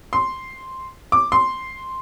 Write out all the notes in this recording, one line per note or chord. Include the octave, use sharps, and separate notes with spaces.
C6
D6
C6